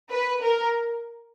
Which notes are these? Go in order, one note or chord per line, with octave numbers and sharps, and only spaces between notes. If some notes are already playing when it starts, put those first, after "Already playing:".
B4
A#4